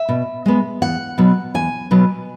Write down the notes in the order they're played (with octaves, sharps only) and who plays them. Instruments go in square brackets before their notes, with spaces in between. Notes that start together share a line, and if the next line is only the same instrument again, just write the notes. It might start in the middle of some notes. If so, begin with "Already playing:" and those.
Already playing: [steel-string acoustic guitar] E5
B2
G#3 B3
E2 F#5
B2 F#3 B3
E2 G#5
B2 F#3 B3